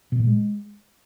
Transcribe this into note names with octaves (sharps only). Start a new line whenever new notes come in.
B2
A#2
G#3